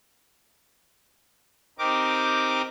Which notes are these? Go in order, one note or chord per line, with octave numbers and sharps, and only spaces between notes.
C4 D#4 G4 A#4 D6